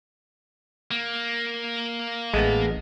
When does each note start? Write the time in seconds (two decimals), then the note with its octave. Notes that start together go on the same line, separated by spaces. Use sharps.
0.91 A#3
2.33 A1 G#3 A3 B3